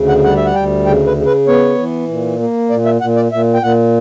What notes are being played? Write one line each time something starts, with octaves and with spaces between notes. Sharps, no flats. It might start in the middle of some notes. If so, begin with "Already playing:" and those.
Already playing: D2 C#3
F#5
G3 F#5
E5
F#5
D2 G5
C#3 G5
B4
C#3
B4
B3 C#5
E3
A#2
A#3
A#2 D5
E5
A#2 F#5
D5
A#2 E5
G5
A#2 F#5